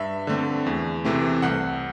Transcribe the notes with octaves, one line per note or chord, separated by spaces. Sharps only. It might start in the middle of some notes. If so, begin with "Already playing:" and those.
Already playing: G2 E5
D3 A3 C4
E2
C3 E3 A3 C4
C2 F#5